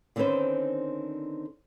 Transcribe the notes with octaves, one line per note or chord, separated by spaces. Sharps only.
D3 D#3 C4 C#4 B4 C5